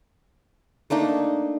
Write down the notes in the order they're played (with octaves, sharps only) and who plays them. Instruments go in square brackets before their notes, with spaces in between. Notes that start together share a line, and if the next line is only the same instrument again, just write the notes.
[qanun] A3 A#3 D4 D#4